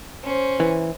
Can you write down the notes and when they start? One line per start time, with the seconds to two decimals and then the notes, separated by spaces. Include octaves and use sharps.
0.24 C#4 C5
0.60 E3